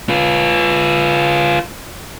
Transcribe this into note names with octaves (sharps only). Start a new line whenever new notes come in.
F4 B4